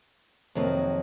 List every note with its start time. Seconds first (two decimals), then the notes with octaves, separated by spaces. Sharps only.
0.55 F2 C3 D#3 F#3 A#3